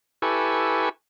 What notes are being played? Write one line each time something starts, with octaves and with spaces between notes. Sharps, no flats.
E4 G4 A4 B4 G#5 C#6